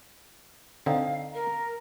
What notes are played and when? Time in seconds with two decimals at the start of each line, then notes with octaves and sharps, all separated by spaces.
0.86 D3 C4 D#4 F5
1.34 A#4 A#5